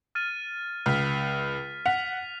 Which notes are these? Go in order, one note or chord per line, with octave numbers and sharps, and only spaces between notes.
F6 A6 D#7
C#2 F6 B6
F#5 B6 F7